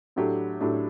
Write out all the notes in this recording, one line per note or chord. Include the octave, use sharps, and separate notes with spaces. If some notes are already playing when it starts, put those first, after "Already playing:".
A2 F#3 A3 D4 G4
A2 F#3 A3 D4 G4